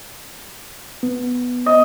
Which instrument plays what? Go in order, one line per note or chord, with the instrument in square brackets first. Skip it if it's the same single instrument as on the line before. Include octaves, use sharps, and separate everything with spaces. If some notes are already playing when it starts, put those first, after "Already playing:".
[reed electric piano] B3
[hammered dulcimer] D#5